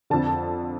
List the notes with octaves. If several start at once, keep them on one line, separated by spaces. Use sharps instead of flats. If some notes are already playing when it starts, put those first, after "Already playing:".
F2 D3 A5